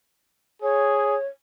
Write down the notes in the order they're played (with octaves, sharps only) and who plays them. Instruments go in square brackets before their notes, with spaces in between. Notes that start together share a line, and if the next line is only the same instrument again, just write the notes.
[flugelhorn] G#4 [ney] C#5